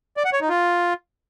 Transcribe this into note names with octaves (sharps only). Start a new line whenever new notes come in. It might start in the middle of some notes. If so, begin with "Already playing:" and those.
D5
F#5
C#5
D#4
F4